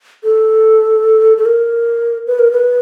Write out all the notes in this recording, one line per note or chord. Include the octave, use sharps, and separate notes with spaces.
A4
A4
A#4
B4
A#4
B4